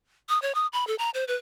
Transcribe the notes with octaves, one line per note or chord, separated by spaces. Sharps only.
D#6
C#5
D#6
B5
A4
A#5
C5
B4